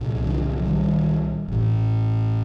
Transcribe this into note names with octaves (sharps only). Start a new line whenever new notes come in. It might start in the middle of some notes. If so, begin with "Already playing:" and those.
Already playing: C2 A#2
D3 F3
D#3 G3
A1 A2